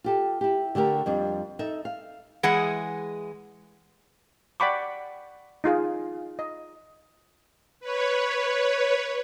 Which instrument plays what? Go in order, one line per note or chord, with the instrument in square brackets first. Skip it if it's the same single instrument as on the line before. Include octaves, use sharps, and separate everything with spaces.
[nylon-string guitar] F4 G4 A4
E4 G4
D3 A3 G4 A#4
F2 G3 D4
D#4 A4 E5
F5
[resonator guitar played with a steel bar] E3 G#3 G#4 F#5
[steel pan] D5 F#5 G5 B5 C#6 D6
D#4 F4 G#4 F5
D#5
[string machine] B4 C#5